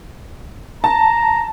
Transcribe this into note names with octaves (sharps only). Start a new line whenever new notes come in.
A5 A#5